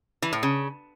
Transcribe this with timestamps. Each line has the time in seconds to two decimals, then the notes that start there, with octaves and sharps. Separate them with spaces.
0.22 E3
0.33 A2
0.43 C#3